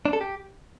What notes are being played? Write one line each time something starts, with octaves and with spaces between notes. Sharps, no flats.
D4
A4
G4